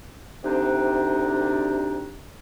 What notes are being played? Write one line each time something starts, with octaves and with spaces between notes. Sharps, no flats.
D2 C3 D4 D#4